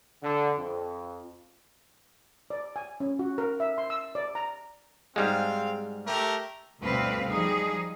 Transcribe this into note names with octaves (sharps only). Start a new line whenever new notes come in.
D3
F2
D5
G#5
C#4
F#4
A#4
E5
C6
E6
D5
A#5
G#2 G3 G#3 C4 F5
A3 G4 A#4
D2 G2 B2 C4 B4 F5
F3 G3 D#4 G#4